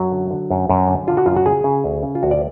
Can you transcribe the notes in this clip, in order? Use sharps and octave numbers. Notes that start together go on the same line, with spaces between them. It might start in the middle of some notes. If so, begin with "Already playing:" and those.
Already playing: F#2 F#3
D3
D3
F#2
F#2
D3
D3 F4
F#4
F#2 F4
F#4
C#3 G#4
C#3
D2
C#3
F4
D2 F#4
D5